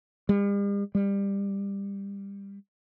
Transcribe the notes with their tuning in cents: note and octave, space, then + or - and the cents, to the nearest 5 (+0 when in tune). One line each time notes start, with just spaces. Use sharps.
G3 +45
G3 +20